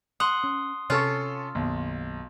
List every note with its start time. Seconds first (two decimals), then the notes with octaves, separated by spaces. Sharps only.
0.20 F#5 C6 D#6
0.44 C#4
0.90 C3 C#4 F4 A4 C#6
1.55 B1 F#2 D#3 A#3